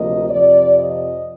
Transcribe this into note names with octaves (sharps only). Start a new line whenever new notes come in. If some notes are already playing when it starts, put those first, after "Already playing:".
Already playing: D2 C3 F3 A#3 D#5
F2 C3 F3 D5
D#5